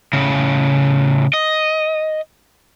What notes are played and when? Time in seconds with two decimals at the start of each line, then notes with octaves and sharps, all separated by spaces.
0.13 A2 C#3
1.33 D#5